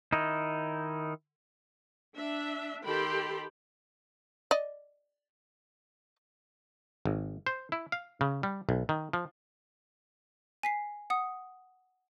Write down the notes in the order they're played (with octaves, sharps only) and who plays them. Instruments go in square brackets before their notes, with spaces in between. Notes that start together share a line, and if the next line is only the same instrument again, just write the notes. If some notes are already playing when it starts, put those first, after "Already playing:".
[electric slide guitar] D#3 D#4 E4
[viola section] D4 E5
D#3 G4 A4 G5 B5 C6
[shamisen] D5 D#5
[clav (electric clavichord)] G#1
C5
E4
F5
C#3
G3
B1
D#3
F3
[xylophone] G#5 B6 C7
F#5 D#6